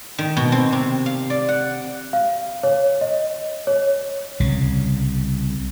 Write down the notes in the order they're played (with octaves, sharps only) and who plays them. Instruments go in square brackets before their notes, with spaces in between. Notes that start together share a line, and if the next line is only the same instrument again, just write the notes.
[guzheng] D#3
B2
C4
C3
F5
D5
F#5
[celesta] F5
C#5
D#5
C#5
[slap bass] C2 C#3